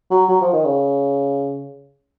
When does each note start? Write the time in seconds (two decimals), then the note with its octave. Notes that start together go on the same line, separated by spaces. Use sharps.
0.11 F#3
0.29 F#3
0.41 F3
0.53 D#3
0.65 C#3